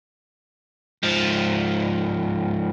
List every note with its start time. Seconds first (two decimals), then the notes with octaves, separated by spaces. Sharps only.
1.03 G#2 F3